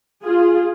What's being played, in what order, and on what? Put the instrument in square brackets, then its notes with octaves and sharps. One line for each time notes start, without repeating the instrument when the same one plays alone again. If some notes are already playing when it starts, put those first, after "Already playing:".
[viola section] F4 G#4